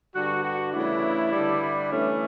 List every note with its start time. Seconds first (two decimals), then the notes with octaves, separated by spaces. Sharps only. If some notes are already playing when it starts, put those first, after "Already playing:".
0.14 G2 D3 G3 F#4
0.43 F#4
0.73 C#3 E3 A3 D4 E4
1.31 G2 D3 G3 D4
1.90 E3 A3 C#4 E4